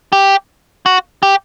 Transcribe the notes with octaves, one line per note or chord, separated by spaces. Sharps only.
G4
F#4
G4